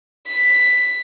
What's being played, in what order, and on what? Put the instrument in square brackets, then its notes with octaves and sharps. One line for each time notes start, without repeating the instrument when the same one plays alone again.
[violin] B6